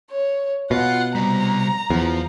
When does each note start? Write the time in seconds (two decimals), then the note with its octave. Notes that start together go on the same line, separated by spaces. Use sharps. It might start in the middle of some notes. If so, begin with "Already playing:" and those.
0.10 C#5
0.71 B2 F4 F5 F#5
1.15 C3 G3 A#5
1.90 E2 F3